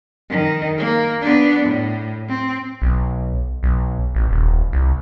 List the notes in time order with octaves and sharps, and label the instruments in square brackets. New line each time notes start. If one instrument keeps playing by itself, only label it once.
[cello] D#3
A#3
B3 D4
A2
C4
[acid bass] B1
B1
A1
D#1
C2